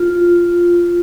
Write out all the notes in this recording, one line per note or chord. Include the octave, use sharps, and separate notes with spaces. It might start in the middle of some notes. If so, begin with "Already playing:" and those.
Already playing: F4